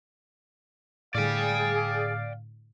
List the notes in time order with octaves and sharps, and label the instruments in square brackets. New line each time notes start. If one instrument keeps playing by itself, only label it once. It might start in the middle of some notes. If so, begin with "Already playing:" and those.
[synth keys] A2 D3 [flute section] G#4 [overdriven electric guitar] D5 G5 [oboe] F5